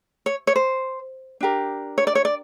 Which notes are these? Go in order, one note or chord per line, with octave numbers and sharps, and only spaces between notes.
C#5
C#5
C5
D4 G4 A#4
C#5
D5
C#5
D5